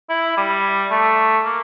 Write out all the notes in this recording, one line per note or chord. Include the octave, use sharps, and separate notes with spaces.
E4
G3
A3
A#3